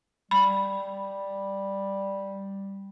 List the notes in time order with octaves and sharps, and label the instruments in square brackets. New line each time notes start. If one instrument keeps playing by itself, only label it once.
[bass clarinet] G3 [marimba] B5